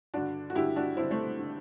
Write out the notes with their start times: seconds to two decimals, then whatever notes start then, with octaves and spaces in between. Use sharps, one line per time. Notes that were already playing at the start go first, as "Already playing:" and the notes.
0.14 G2 D3 D4 F#4
0.50 F#4
0.55 G2 D3 E4 G4
0.76 D4 F#4
0.97 G2 D3 C4 E4
1.11 A3 C4
1.39 D3